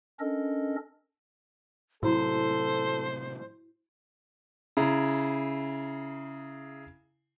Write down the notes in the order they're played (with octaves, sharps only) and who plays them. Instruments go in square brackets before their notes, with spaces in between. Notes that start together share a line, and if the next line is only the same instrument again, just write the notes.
[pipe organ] C#4 D4 A4 A#4 D#5
[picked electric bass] A2 C3 F#3 [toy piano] E4 F#4 [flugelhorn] A4 [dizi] C5
[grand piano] C#3 E4 A#5